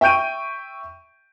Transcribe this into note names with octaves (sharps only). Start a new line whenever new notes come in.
E5 G5 C#6 G6 D7 D#7